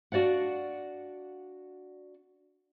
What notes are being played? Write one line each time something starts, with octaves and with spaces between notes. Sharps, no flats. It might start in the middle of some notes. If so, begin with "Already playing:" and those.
D4 F#4 D5 F5 F#5